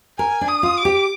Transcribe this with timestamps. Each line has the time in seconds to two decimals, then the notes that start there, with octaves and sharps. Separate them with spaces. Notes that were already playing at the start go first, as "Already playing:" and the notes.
0.19 A#4 G#5
0.41 D4
0.48 D#6
0.63 F4
0.78 D6
0.85 G4